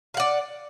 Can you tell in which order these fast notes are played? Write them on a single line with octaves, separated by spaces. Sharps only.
F5 F#5 D5